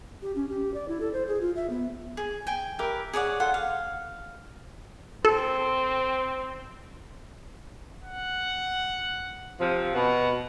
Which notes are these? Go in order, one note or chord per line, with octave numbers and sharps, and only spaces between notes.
G4
C#4
G4
D5
E4
A4
C5
G#4
F4
E5
B3
G#4
G5 G#5
G4 A#4 B4 E5
G#4 C#5 D5 F#5
F4 A4 F#5
F5
C4 A4
F#5
C3 F3
B2 F#5